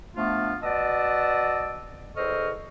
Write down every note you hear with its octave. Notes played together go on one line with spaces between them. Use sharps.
F3 A3 B3 D4 F4
F#4 B4 D5 D#5 A5 E6
E2 A4 C5 D#5 C#6 F6